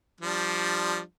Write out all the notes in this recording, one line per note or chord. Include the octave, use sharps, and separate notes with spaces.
F3 G3 D4